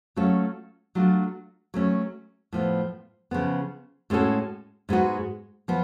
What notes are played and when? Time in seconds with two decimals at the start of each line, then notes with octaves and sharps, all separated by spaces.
0.16 F#3 A3 C#4 F4 A4
0.95 F#3 A3 D4 F4
1.74 F#3 A3 C#4
2.52 A2 F3 B3
3.31 C#3 F3 B3
4.10 A2 G#3 C#4 F#4 A4
4.89 G#2 G#3 B3 F#4
5.68 F3 B3